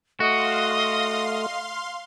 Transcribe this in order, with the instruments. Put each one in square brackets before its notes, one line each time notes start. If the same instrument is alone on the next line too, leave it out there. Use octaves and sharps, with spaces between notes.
[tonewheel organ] A3 [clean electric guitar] F#4 [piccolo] D#5 [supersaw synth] F5 C6